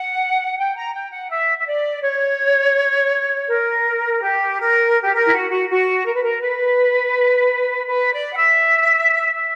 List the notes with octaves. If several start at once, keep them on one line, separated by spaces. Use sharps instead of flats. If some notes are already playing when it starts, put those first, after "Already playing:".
Already playing: F#5
G5
A#5
G5
F#5
E5
E5
D5
C#5
A#4
G4
A#4
G4
A#4
E4
F#4
F#4
F#4
A#4
B4
A#4
B4
B4
D5
F#5
E5
E5